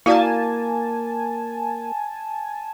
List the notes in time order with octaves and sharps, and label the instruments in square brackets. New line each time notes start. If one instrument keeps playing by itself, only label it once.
[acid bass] A#3 [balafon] E4 F#4 D5 [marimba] F5 [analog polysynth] G#5 A5